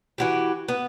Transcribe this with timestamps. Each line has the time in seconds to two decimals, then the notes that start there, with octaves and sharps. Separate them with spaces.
0.18 E3 F#4 G4
0.68 B3